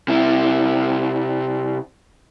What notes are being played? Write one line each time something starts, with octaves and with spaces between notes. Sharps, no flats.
C3 E4